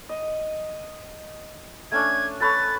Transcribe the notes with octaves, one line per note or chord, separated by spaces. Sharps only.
D#5
A3 C#4 D4 G#6
A4 B4 C#5 A6